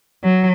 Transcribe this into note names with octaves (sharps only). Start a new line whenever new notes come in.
F#3